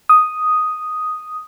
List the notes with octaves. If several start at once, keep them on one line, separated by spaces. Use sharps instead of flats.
D#6